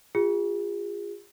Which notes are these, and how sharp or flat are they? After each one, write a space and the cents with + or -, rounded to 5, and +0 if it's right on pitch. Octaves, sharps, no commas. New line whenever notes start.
F4 +5 G#4 -35